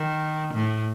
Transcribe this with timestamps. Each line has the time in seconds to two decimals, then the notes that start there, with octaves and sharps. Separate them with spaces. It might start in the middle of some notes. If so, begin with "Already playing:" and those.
Already playing: D#3
0.54 A2